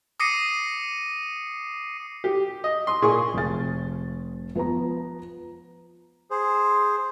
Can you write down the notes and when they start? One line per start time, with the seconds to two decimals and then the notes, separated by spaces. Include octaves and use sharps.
0.20 D6 D#6 A#6 C7 C#7 D#7
2.24 G4
2.64 D#5
2.87 C6 D#6
3.02 A#2 G#4 C#6
3.34 F1 A6
4.55 F3 B3 B4 A#5
6.31 G#4 C5